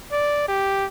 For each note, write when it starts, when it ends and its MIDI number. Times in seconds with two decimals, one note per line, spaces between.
0.12 0.47 74
0.49 0.86 67